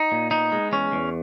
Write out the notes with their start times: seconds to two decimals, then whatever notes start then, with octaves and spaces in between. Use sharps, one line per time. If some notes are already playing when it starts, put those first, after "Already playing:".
Already playing: D#4
0.12 A#2
0.31 B3 D#4
0.52 G#3
0.72 E2 C#4
0.92 E2